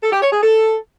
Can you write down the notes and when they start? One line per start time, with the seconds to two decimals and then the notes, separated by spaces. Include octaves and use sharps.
0.03 A4
0.12 G4
0.22 C#5
0.32 G#4
0.42 A4